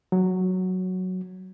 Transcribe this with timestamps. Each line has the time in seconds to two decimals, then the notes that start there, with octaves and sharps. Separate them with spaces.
0.12 F#3